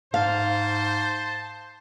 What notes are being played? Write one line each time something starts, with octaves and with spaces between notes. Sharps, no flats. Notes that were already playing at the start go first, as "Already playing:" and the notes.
G#2 C5 F5 A5